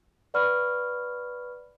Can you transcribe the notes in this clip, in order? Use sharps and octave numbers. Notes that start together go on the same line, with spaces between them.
B4 D5 F#5 B5 C#6 F6